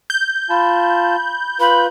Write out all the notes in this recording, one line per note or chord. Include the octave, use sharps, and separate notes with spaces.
G6
F4 A5 B5
F4 B4 B5